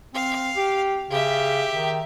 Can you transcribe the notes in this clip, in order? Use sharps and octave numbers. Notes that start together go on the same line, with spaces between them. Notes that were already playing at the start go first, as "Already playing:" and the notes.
C4 F5
G4
C#3 G4 E5
D#3